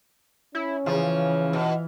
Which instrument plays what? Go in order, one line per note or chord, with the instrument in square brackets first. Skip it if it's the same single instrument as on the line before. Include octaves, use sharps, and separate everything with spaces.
[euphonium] C#4 [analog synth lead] E4
[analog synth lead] C#3 [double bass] E3 [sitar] F3
[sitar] B2